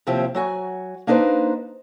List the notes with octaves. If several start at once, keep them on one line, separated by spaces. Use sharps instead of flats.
D#2 C3 F3 C4 E4 G4
F#3 F#4 G#5
A#3 D4 D#4 B4 C5